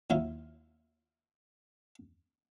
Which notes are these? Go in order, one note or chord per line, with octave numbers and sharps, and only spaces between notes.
D#2 F#3 E4 F4